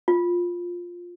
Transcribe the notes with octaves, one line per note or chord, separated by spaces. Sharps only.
F4